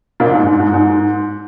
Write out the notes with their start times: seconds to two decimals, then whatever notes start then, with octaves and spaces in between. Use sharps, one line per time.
0.20 A#1 A#2
0.33 G#2
0.46 G#2
0.60 G#2
0.74 G#2